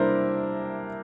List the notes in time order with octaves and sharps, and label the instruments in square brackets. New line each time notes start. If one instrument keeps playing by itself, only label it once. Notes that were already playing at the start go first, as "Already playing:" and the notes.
Already playing: [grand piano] C3 G3 A#3 D4 E4 A#4 C5